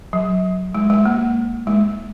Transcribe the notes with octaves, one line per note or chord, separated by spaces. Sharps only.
F#3
G#3
G#3
A#3
G#3